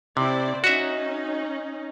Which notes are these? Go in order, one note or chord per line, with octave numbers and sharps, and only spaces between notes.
C3 E4 C5 D5
C#4 D#4 F#4 E5